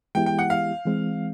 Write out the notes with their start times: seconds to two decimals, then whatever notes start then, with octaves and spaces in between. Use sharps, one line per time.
0.15 E3 G#3 B3 E4 G4 G5
0.26 G5
0.39 F#5
0.50 F5
0.85 E3 G#3 C4